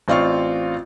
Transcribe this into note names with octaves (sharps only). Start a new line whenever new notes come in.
A1 C4 F4 D5 F5 C#6